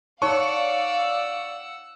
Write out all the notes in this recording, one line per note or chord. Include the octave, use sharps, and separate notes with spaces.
D#4 C#5 D5 F5 F#5 A5 C#6 E6